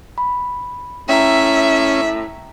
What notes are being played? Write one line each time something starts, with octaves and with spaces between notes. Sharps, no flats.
B5
A2 C#4 E5 G5 A#5